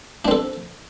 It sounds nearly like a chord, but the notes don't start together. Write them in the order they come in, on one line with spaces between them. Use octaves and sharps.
D4 C4 A4